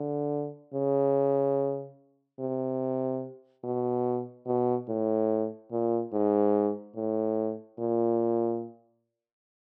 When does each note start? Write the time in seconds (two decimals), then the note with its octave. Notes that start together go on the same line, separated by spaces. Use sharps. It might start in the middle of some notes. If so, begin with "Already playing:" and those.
Already playing: D3
0.74 C#3
2.39 C3
3.64 B2
4.47 B2
4.89 A2
5.72 A#2
6.13 G#2
6.96 A2
7.79 A#2